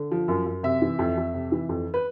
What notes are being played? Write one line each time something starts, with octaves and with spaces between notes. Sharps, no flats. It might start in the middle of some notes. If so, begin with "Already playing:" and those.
Already playing: D3
F3
F#2
F#2
C3 E5
E3
F2
F2
C3
E3
F2
B4